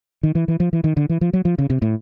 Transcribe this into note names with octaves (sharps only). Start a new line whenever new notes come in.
D#3
E3
E3
F3
E3
D#3
D3
E3
F3
F#3
F3
C#3
C3
A2